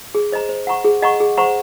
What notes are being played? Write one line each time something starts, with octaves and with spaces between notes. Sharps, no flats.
G#4
C5 D#5 A#5
C5
F#5 A#5 C#6
G#4
D#5 F#5 A#5 C#6
G#4
C5 F#5 A#5 C#6